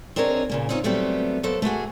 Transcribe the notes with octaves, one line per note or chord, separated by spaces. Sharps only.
C4 D4 G#4 A#4 C#5 D#5
A#2 C#3 A#3
C4 C#4 D#4 F4 C#5
F#3 G3 A3 B3 C4 G4
F#3 A#3 B3 A4 C5
A3 A#3 F#4 G#4